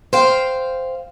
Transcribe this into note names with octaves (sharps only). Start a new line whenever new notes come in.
C5 F5 G5